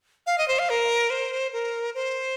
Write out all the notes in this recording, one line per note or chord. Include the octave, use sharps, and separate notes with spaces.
F5
D#5
C5
F5
A#4
C5
A#4
C5